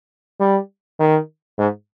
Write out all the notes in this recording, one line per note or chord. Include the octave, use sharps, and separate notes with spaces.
G3
D#3
G#2